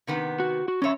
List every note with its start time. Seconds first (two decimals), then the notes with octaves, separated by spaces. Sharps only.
0.07 C3 D#3 B3
0.40 F#4
0.68 F#4
0.82 F2 C#4 C#5 E5